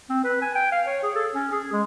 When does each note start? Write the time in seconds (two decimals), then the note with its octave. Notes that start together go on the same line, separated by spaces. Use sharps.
0.09 C4
0.24 B4
0.42 G#5
0.55 G5
0.72 F5
0.87 C#5
1.03 G#4
1.16 A4
1.35 C#4
1.52 G#4
1.72 G#3